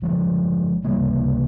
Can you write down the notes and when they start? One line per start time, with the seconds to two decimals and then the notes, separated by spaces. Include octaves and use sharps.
0.02 G1 G2 F3 G#3
0.84 C#2 C3 G3 A#3